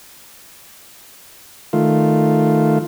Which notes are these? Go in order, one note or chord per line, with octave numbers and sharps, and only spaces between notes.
D#3 A3 F4